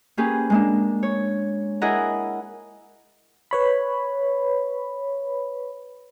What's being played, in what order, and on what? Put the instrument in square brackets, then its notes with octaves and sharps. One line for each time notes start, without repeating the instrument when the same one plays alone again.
[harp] A#3 C#4 G4 G#4 B4
G#3 A#3 D4
C#5
E4 G#4 A#4 D#5 F#5 A#5
[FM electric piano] B4 C#5 B5